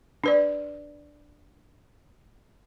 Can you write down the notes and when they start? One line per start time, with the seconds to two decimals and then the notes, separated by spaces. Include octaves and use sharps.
0.24 D4 B4 D5